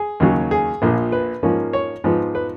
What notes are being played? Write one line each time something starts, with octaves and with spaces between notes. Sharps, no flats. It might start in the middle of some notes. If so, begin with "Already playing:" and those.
Already playing: G#4
D#2 C#3 F#3
G#4
A#1 A#2 F3
B4
G#2 F3 A#3 C#4
C#5
G#2 F3 B3
B4